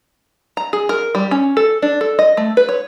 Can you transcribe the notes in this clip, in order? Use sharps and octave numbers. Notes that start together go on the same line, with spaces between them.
A#5
G#4
A#4
G3
C#4
A4
D4
A4
D#5
A3
B4
C#5